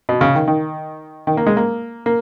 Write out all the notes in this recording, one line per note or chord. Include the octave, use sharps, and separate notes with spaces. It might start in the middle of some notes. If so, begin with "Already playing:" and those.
B2
C#3
D#3
D#3
D#3
A#3
G#3
A#3
A#3